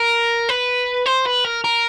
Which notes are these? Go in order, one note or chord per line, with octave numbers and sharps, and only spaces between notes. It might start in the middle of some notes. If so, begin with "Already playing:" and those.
Already playing: A#4
B4
C5
B4
A#4
A#4